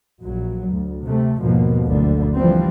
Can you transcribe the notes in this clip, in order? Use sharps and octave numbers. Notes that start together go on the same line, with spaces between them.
A#1 F#3
D2
C3 A3
G#1 D#2 B2 F3 A#3
F#1 D2 D3
E3 F3 G3 C4